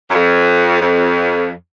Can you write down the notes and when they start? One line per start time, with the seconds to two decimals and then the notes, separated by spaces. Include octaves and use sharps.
0.10 F#2
0.15 F2
0.82 F2